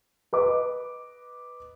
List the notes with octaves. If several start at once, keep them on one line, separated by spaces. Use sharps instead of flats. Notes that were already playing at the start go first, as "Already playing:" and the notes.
B4 D#5 D6